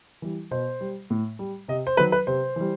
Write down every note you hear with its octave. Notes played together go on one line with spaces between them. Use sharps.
E3 G3
B2 C5
G3
A2
G3
C3 D#5
C5
D#3 F#3 B4
B4
C3 C5
E3 G3